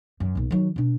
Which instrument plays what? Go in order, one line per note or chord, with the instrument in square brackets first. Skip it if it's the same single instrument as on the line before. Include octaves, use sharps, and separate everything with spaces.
[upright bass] F#2
B1 A#2
D#3 F#3
B2 D4